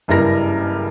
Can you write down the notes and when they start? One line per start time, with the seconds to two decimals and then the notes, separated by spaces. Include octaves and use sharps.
0.08 F#1 G2 E4 A#4 A#6